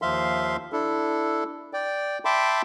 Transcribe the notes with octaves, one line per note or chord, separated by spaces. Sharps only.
D#2 F3 E5 F5 C6
D4 E4 A4
D5 G5
E5 G5 A5 B5 C6 D6